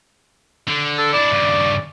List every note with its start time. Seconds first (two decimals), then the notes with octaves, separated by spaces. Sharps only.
0.68 D3
0.98 A4
1.13 D4 E4 D5
1.31 G2 C#3